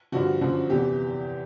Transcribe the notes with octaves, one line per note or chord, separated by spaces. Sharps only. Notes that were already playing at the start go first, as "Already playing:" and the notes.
G2 D3 F3 F#4
F#2 D3 F3
E2 C3 E3 G4